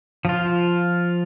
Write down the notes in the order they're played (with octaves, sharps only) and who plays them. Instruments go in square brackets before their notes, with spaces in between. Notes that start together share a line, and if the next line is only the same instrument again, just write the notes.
[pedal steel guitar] F3 F4